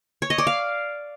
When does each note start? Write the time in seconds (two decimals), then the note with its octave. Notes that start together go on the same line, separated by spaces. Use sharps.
0.22 C#5
0.30 D#5
0.38 D5
0.47 F5